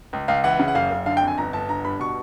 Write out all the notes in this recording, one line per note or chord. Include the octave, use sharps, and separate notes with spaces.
C#2
C#2 F5
E3 F#5
C#3
F#5
F#1 F5
F#1
D3 F5
G5
F2
G#5
G1 A#5
G1 A5
D3 A#5
G2 B5
B2 C#6